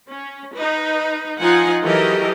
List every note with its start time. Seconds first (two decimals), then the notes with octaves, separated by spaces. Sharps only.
0.10 C#4
0.55 D#4 B4
1.40 F3 D#4 F4 F#5 G#5
1.83 E3 F#3 G4 A4 A#4 D#5